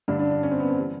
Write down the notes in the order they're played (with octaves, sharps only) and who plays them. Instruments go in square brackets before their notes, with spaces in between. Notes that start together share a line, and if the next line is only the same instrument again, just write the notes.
[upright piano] G2 D3 G3 D4
D4
D4
C#4
C4
B3
C4
E3 G3